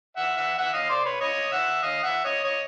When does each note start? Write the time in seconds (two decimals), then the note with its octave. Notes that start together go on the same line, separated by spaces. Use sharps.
0.17 E5 F#5
0.37 E5 F#5
0.58 E5 F#5
0.74 D#5 F5
0.89 C5 D5
1.05 B4 C#5
1.21 C#5 D#5
1.51 E5 F#5
1.82 D#5 F5
2.03 E5 F#5
2.24 C#5 D#5
2.44 C#5 D#5